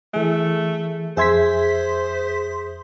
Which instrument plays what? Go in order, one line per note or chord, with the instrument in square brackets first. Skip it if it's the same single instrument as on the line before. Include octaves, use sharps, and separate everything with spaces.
[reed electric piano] E3 G#4 [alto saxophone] A3
[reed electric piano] F2 E5 G#6 [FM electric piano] G#4 C6 B6 [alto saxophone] C5